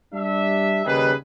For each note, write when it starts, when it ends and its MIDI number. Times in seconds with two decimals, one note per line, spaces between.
0.13 0.80 55
0.13 0.80 62
0.13 0.80 76
0.85 1.12 39
0.85 1.12 49
0.85 1.12 55
0.85 1.12 63
0.85 1.12 68
0.85 1.12 71